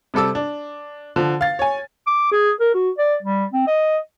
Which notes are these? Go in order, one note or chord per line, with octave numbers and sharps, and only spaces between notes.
C3 G3 A4 D6 E6
D4
D3 F3
F5 A6
C#5 G#5
D6
G#4
A#4
F#4
D5
G3
C4
D#5